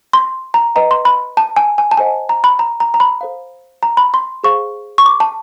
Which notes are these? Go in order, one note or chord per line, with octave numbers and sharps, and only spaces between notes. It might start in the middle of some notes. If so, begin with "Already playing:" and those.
C6
A#5
B4 D#5 G5 A#5
C6
B5
A5
G#5
G#5
A5
A4 C5 D#5 F#5 G#5
A#5
B5
A#5
A#5
A#5
B5
A4 C5 F5
A#5
B5
C6
G#4 C5 F5 C#6
C#6
D6
A5